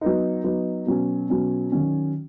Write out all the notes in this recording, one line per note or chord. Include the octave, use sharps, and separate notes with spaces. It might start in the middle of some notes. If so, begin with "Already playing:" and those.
F#3 B3 D#4
F#3 B3 D#4
B2 F#3 C#4
B2 F#3 C#4
D#3 F#3 C#4